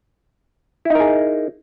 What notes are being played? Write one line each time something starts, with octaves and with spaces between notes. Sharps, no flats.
D#4 E4 G#4 A#4